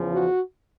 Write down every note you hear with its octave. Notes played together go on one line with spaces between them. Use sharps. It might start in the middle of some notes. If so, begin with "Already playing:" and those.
Already playing: E2 C#3 F3
F#4